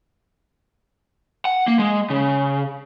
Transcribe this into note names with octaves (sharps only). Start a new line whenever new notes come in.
F#5
A#3
G#3
C#3